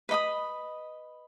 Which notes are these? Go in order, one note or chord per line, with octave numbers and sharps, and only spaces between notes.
B4 D#5 B5 D#6